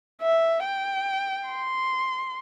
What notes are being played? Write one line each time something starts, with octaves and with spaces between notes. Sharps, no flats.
E5
G5
C6